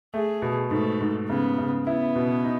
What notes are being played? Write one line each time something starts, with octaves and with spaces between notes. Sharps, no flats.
A3 G#4
B2
G#2 A3
G#2
C#3 B3
C#3
B3 E4
B2
D#4